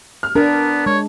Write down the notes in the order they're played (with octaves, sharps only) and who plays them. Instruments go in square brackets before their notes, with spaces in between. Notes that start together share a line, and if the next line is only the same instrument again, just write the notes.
[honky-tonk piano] F6
[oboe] B3 [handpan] D4 [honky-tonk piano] A#4
[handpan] G#3 [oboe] C#5